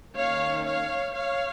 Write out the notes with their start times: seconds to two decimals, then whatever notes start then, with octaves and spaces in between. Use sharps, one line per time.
0.14 D#3 A#3 C#4 C#5 F5
0.64 C#5 F5
1.14 C#5 F5